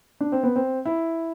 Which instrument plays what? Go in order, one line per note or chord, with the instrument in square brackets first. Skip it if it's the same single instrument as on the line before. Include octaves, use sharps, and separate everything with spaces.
[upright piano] D4
C4
B3
C4
E4